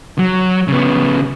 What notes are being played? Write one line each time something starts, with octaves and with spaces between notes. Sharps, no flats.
F#3
C#3 B3